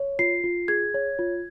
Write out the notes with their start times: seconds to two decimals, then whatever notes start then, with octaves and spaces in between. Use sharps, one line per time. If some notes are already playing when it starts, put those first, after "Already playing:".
Already playing: C#5
0.19 F4 C7
0.44 F4
0.68 G#4 G#6
0.94 C#5
1.19 F4